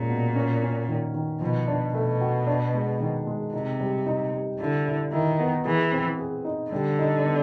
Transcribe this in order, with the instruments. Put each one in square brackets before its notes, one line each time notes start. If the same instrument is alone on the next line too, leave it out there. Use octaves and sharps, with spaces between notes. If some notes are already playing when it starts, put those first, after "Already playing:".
Already playing: [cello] A#2 [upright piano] G#3 C#4
[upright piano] B2
C#4
C#4
D#3
D#3
[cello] B2 [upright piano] F3
[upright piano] D4
[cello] B2 [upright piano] A3
[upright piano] F#4
D4
G#3
D#3
G#3
[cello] C3 [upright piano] D#4
[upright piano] G3
D#4
G3
[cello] D3 [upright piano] E4
[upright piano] E4
[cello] D#3 [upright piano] E4
[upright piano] B3
[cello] E3 [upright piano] G#4
[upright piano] C4
G#4
D#4
[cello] D3 [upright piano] G3
[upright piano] D#4
B3